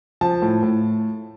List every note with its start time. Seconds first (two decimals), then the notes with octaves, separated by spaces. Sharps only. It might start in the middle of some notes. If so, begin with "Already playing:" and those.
0.21 F3 A5
0.42 A2
0.63 A2